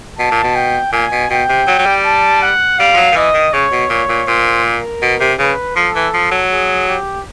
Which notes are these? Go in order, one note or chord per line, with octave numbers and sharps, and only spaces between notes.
B2 A5
A#2
B2
G5
A#2 G#5
B2
B2 G5
C3
F#3
F#3
G3
A5
F#5
G3 F5
F3
F#3
D#3
E3 D#5
D#3
C#3 C#5
B2
A#2 C#5
A#2
A#2 C5
A#4
B2
C3
C#3 B4
F3 A4
E3
F3
F#3
G#4
G4